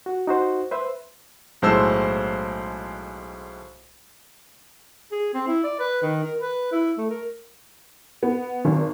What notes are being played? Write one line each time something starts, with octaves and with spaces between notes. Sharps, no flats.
F#4
D#4 F#4 C5
B4 C5 E5
B1 A2 G#3 C5 A5 E6
G#4
C4
E4
D5
B4
D#3
A#4
B4
E4
A3
A#4
B3
G#1